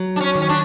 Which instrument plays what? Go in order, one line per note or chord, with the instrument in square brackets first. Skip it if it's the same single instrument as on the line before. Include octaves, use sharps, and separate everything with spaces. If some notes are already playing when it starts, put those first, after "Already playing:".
Already playing: [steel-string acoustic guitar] F#3
[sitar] D4
C#4
[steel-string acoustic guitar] D#3
[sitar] C#4
D4